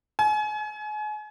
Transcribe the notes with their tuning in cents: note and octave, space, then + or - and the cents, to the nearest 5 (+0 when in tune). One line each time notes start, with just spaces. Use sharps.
G#5 +35